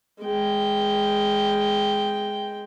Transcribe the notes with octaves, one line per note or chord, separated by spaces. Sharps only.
G#3 G5